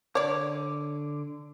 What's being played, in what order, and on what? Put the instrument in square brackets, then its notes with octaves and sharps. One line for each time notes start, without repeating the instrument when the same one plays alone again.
[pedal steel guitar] D3 D6 [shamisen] C#5 D5